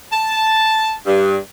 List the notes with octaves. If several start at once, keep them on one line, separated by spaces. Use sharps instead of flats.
A5
G2